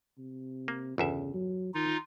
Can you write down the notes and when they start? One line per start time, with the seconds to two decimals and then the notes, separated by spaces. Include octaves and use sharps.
0.18 C3
0.68 A#3
0.98 G1 E2 C#3 E5
1.34 F#3
1.74 D#3 D#4 F4